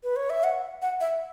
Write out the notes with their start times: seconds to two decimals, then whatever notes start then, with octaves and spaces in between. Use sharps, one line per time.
0.03 B4
0.16 C#5
0.30 E5
0.44 F#5
0.82 F#5
1.01 E5